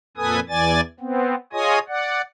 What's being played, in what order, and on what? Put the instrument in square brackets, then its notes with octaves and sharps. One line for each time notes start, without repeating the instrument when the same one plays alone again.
[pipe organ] F2 A#2 A4 B4 G#5 D#6
E2 E3 D5 G#5 A6
B3 C4
F4 G#4 C#5 D#5 G#5 D#6
D5 F#5